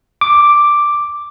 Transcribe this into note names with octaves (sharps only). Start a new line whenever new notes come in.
D6